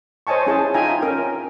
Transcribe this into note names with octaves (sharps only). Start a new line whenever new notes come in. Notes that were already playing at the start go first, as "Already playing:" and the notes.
C5 C#5 D#5 G#5 A5 C#6
C#4 E4 G#4 G#5 A5
D#4 F4 E5 G5 G#5 A#5
C#4 A#4 G5